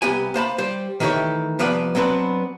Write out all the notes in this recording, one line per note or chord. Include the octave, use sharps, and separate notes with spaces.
C2 B3 G4 G5 G#5
A#3 C5 A5 B5
G3 C5
D#3 E3 A3 C#4 G4 C#5
C2 F3 B3 D5 F#5
F#3 B3 C4 D4 B4